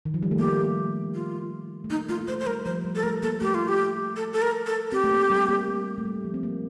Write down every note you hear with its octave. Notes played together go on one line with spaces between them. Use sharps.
D#3
F3
G3
A3
A#3 G4
F4
A3
A#3 D#4
A3 F4
A#3
A3 C5
C5
G3 A#4
F3 C5
G3
A4
A3 A#4
A#3 A4
A3 G4
F4
G4
A4
A4
A#4
A4
C4 G4
A3
A#3
G3
A#3
A#3
A3
G3
F3
C4
A#3